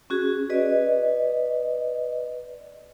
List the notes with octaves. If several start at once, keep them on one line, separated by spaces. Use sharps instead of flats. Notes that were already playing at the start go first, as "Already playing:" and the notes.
C#4 F#4 G#4
B4 D5 D#5